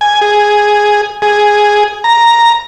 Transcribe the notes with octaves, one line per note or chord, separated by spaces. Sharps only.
G#5
G#4
G#4
A#5